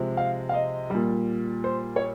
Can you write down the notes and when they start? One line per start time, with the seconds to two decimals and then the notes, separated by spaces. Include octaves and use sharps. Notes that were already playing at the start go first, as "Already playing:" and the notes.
Already playing: C3 F3 G#3
0.17 F5
0.49 F5
0.54 D#5
0.90 A#2 G3
1.64 C5
1.96 C#5